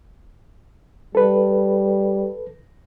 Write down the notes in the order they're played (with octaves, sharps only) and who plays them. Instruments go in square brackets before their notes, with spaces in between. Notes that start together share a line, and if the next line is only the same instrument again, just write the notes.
[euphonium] G3 [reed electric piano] A4 B4